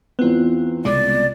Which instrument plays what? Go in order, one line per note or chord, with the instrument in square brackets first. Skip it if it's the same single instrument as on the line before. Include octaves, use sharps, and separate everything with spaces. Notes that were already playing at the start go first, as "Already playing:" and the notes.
[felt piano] E2 C4 [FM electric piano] B3 F4
[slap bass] C2 C#3 G#3 [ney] D5 [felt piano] D6